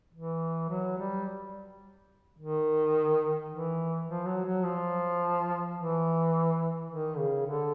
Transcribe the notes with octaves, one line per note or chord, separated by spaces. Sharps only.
E3
F#3
G3
D#3
E3
F3
F#3
F#3
F3
E3
D#3
C#3
D3